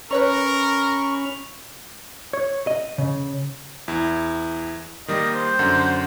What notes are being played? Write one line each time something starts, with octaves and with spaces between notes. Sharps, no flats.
C#4 A#4 B4 C#5 A#5 B5 C#6 F6
C#5
D#5
C#3
E2 E4
D#3 G3 A#3 D#5
C5
F#2 D3 F#5